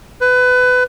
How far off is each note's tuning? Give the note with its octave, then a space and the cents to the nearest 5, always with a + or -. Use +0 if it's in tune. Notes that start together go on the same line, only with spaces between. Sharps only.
B4 +25